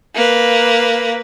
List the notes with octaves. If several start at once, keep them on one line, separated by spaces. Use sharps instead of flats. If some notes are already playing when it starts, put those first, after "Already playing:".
A#3 B4